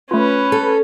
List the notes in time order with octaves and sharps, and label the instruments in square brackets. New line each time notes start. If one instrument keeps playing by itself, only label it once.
[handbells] A3 F4 [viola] C#4 [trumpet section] B4
[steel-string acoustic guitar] A4